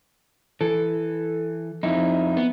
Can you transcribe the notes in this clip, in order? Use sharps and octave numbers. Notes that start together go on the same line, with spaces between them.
E3 A4
F2 D#4 E4
B3